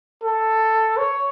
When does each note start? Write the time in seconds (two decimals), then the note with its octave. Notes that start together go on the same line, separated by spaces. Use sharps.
0.23 A4
0.97 C#5